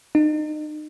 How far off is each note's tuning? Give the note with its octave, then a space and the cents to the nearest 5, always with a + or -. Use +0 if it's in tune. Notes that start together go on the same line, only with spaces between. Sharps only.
D#4 -30